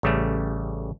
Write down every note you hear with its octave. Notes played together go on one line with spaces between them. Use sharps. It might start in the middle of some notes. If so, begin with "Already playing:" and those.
A1 C#3 G3 A3